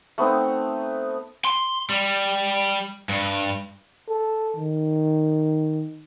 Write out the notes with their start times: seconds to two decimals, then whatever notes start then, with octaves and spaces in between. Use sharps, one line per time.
0.18 A3 B3 C4 D#4
1.45 C6
1.90 G3
3.09 G2
4.09 A4
4.57 D#3